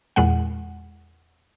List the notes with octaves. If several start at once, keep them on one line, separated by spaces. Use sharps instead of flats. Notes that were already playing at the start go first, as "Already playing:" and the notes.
E2 A#2 G#3 F#5